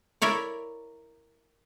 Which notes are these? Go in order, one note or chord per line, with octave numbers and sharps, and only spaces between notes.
E4 A#4 C#5 D5